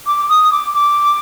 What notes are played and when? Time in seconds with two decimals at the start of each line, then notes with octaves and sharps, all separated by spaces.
0.07 D6
0.29 D#6
0.52 D6
0.74 D6